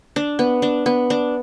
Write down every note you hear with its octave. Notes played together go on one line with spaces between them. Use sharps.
D4
B3
D4
B3
D4